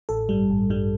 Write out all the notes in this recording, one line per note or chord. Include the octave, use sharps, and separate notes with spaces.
A1 A4
G2 G3
A1
G2 G3